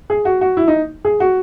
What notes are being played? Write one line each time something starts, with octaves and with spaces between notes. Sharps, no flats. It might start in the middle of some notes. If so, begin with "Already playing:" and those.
G#4
F#4
F#4
E4
D#4
G#4
F#4